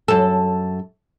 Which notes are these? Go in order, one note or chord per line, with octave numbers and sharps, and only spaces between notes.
F#2 A4